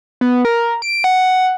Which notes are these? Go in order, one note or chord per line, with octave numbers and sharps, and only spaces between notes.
B3
A#4
D7
F#5